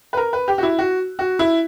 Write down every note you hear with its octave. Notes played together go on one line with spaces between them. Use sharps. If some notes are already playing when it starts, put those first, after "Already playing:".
B4
A#4
B4
G4
F#4
E4
F#4
F#4
E4